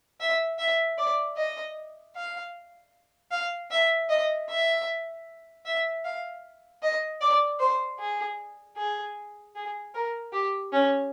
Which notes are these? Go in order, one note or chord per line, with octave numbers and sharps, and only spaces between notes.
E5
E5
D5
D#5
F5
F5
E5
D#5
E5
E5
F5
D#5
D5
C5
G#4
G#4
G#4
A#4
G4
C#4